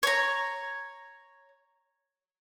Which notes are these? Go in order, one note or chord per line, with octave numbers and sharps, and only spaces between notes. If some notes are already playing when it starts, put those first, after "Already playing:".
C#5 A#5